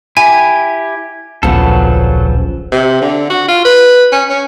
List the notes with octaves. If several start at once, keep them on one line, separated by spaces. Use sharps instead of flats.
E4 G4 G#5
D1 A#1 C#3 F3 F#3 B3 A4
C3
D3
F#4
F4
B4
C#4
C#4